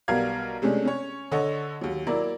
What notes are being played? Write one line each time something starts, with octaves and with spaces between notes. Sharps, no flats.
B1 G3 B3 A#4 F5 G#6
C3 G#3 A3 C#4 D4
C#4 C#5
D3 A4 C#5 D#5
D#2 F#3
F#3 A#3 E4 A#4 D5